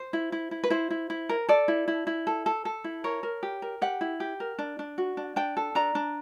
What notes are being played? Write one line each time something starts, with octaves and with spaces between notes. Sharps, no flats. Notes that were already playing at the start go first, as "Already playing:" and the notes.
Already playing: C5
E4
E4
E4
B4
E4 C5
E4
E4
A#4
A4 D5
E4
E4
E4
A4
A4
A4
E4
A#4 C#5
A#4
G4
A#4
G4 F#5
E4
G4
A#4
D4
D4
F#4
D4
D4 G5
A4
D4 A#5
D4